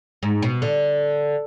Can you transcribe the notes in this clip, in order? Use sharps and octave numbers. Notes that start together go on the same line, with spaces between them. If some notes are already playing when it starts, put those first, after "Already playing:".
G#2
B2
D3